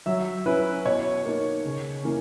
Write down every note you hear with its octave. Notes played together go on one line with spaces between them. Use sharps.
F#3 E5
C#4 E4 B4
B2 C#5
A#3 D#4
C#3
E3 A#3 C#4